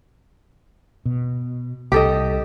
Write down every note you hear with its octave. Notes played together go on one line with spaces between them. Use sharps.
B2
C2 G4 A4 D#5